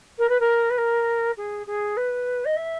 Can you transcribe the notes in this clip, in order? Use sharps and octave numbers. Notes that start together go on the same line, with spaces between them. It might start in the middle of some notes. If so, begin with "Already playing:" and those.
A#4
B4
A#4
B4
A#4
G#4
G#4
B4
D#5
E5